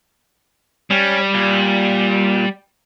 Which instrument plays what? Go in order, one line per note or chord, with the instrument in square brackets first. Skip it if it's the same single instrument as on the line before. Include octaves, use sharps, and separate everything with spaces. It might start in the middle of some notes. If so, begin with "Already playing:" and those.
[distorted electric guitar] G3 [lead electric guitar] C#4
[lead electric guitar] A#2